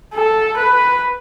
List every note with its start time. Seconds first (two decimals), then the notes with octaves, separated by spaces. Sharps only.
0.15 A4
0.57 B4